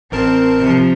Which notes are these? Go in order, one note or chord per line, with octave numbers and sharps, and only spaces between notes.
A1 C4 A#4 A5
C3 F3